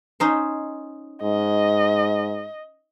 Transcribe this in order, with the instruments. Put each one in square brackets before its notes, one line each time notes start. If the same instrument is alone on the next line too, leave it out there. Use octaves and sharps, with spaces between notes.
[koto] C#4 D#4 C5
[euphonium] G#2 [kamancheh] D#5